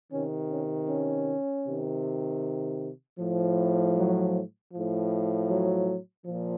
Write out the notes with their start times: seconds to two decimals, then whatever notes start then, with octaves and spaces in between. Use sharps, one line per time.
0.13 C3 D#3 C#4
0.51 C#4
0.89 C#4
1.66 C3 D#3
3.19 A2 F3
3.96 F#3
4.73 A2 F3
5.50 F#3
6.26 A#2 F3